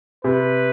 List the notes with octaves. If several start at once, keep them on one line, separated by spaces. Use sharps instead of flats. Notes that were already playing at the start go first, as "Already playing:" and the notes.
C3 B4